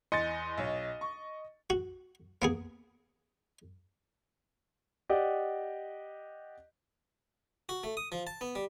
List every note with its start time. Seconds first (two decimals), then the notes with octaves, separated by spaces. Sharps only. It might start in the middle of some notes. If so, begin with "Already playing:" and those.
0.12 E2 D#5 C6 A6 C#7
0.58 B1 C#5
1.01 C#6
1.70 F#4
2.42 A#3 B3 G#4
5.09 G4 D5 D#5 F#5
7.69 F#4
7.84 A3
7.97 D#6
8.12 F3
8.27 A5
8.41 B3
8.55 G3